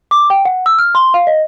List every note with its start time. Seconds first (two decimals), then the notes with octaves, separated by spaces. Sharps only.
0.11 D6
0.30 G5
0.45 F#5
0.66 E6
0.79 F6
0.95 C6
1.14 F5
1.27 D#5